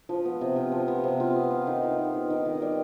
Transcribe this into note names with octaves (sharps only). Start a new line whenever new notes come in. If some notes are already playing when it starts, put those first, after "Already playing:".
F3
B3
C3
F4
F3
B3
C3
F4
B3
F4
D#3
D#3
B3
F4
D#3
D#3
G3